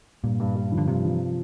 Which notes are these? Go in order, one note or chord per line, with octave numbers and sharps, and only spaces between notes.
G2 A#2
G2
G2
F3
D3
G2 C3
F3